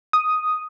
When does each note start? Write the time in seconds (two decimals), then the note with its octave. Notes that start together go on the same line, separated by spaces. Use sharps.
0.13 D#6